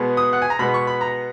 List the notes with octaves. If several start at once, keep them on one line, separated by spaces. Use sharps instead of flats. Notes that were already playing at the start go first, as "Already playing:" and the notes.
Already playing: B2 G#3 B3
D#6
F#5
G#5
A#5
B2 G#3 B3 B5
C#6
B5
A#5